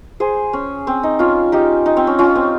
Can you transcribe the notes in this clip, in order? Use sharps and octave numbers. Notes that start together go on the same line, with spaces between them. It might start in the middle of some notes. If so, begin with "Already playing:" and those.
G#4 C5
C#4
C4
D#4
C#4 F4
D#4 G4
D#4
C4
C#4
C#4 F4
C4